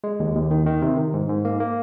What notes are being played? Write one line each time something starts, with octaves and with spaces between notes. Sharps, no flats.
G#3
D#2
D#2
D#3
D#3
C3
D#3
G#2
G#2
A#3
A#3